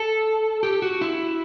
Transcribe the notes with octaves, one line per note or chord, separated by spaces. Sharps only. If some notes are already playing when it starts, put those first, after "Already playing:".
Already playing: A4
G4
F#4
E4